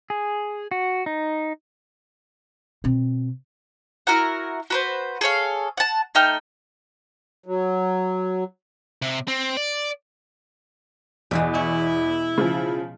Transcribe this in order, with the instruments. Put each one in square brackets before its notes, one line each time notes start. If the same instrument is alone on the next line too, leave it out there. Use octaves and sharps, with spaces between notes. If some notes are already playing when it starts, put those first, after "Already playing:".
[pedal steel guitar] G#4
F#4
D#4
[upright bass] B2 C4
[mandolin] E4 F#4 A#4 F#5
F#4 B4 C5
G#4 A4 C#5 F5
F#5 A5
A3 D#4 G5 F6
[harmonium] F#3
[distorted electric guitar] C3
C4
D5
[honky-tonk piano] E2 [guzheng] B2 E3 G#3
[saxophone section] E4 [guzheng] C#5
[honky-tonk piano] C#3 F3